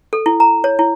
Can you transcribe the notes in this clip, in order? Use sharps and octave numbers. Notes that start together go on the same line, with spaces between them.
A4
E4
A#5
C#5
E4